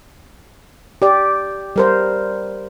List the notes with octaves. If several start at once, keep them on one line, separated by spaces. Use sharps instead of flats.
G4 D5
G3 A#4 C5